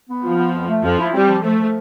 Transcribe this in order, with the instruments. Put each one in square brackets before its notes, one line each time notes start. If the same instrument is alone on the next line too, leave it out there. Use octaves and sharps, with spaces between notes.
[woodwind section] B3
[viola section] F3 [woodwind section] F4
[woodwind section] B3
F2
A3
[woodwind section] F2 [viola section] F3
[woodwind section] E4
[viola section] G3 [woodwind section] C4
[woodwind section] F3
[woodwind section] F3 [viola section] A3
[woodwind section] F3